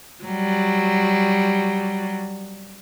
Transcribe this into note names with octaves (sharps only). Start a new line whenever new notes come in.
F#3 G3